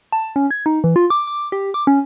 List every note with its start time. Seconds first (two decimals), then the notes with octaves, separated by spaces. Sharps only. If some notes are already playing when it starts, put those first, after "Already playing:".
0.12 A5
0.36 C#4
0.51 G#6
0.66 D#4
0.84 E3
0.96 F4
1.10 D6
1.27 D6
1.52 G4
1.74 D6
1.87 C#4